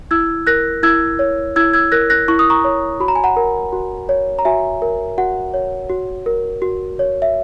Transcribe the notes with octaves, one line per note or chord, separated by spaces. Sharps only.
E4 E6 G#6
A#4 F#6 A#6
E4 E6 G#6
C#5
E4 E6 G#6
E6 G#6
A#4 F#6 A#6
F#6 A#6
E4 C#6
D#6
A#5 C#6
C#5
F#4 B5
A#5
G#5
F#5 A#5
A#4
F#4
C#5
A#5
F#4 E5 G#5
A#4
F#4 F#5
C#5
F#4
A#4
F#4
C#5
E5